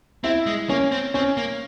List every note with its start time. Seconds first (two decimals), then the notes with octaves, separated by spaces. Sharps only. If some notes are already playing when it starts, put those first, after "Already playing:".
0.24 C4 E4
0.46 G#3
0.69 A#3 C#4
0.92 C4
1.14 C4 C#4
1.37 A#3